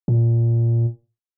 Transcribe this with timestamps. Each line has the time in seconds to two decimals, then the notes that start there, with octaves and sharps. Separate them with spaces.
0.08 A#2